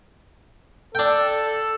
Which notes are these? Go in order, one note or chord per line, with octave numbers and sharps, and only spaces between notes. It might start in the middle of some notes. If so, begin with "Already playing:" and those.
D4 A4 G5